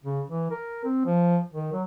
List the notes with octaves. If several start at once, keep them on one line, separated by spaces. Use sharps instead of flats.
C#3
E3
A#4
C4
F3
D#3
F#3